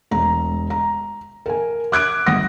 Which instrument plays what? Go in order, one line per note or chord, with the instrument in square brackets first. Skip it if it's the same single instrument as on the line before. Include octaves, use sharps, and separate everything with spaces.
[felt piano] E1 A#5
A#5
A#4 G#5
D6 F#6 G#6 D7
G1 F#5 D#6 A#6